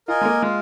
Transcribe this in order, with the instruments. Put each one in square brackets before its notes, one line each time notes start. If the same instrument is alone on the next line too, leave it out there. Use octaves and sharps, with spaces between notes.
[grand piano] F4 [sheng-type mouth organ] A#4 D#5 G#5
[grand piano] G#3
A#3
[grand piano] G#3 [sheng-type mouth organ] F4